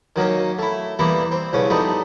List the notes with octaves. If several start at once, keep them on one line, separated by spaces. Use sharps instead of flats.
D#3 F#3 A#3 C#4
A3 E4
E3 G3 A#3 B3 E4
C4
C2 G2 C#3 C#4
F3 G3 A3 B3 D#4